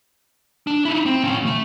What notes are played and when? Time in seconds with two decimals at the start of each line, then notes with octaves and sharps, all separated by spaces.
0.67 D4
0.85 D#4 E4
1.06 C4
1.23 A2 C#4
1.46 A3